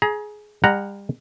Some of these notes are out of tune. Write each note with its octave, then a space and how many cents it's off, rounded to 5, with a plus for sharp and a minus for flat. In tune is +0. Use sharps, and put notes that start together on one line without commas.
G#4 +15 A#5 +35
G3 +35 F#5 +0 A#5 +0